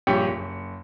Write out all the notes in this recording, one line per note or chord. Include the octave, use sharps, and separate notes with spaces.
A#1 G2 G4 C#5 C#7
F#1